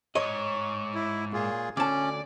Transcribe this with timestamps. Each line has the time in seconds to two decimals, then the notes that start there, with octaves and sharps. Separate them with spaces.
0.15 E2 G#2 C#5 D#5
0.95 E4
1.33 A#2 F4 G#4
1.77 D2 C#4 D5 A5